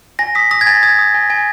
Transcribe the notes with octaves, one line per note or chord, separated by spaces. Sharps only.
G#5 A#6
D#6 B6
D#6 A#6
G#6
G#5 A6
D#6 G#6
D#6
G#5
G#5